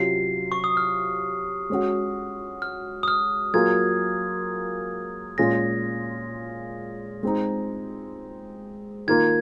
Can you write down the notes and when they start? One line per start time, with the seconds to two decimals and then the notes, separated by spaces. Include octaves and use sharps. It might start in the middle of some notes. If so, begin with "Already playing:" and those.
Already playing: C3 F#3 C#4 F4 C7
0.52 C#6
0.64 D#6
0.77 F6
1.70 G#3 C#4 F#4
2.62 F6
3.03 D#6
3.08 F6
3.54 F#3 A#3 F4 G#4 G#6
5.38 A#2 G#3 C#4 F4 G#4 A#6
7.23 G#3 C4 D#4
9.07 D#3 A#3 F4 G#6